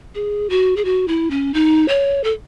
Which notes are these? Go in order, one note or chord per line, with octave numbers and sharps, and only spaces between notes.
G#4
F#4
G#4
F#4
E4
C#4
D#4
C#5
A4